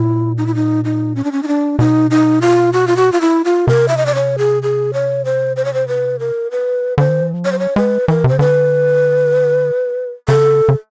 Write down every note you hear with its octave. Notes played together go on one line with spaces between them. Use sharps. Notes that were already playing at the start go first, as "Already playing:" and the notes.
Already playing: A#2 E4
D#4
E4
D#4
D#4
C#4
D4
C#4
D#4
D4
B2 D#4
D#4
F4
F#4
F4
F#4
F4
E4
F4
C3 A#4
E5
D#5
D5
C#5
G#4
G#4
C#5
C5
C5
C#5
C5
B4
A#4
B4
D3 C5
D#3
E3
F3
F#3 C#5
C5
C#5
G#3 B4
E3 A#4
C3
C#3 C5
D3 B4
C#3 A4
C#3